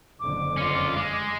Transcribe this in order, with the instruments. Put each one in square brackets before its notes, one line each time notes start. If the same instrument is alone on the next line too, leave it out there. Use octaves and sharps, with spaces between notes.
[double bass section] F#1 F2 D3 [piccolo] D6
[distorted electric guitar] C#4 F4
G#3